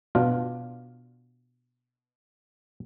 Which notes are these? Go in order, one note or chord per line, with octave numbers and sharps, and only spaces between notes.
B2 D4 F4